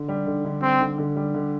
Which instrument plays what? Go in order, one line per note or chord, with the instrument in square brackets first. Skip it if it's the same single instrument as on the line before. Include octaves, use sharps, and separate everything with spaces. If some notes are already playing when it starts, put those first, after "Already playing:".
Already playing: [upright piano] D3
G3
D3
D3
[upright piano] G3 [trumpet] C4
[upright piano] D3
D3
G3
D3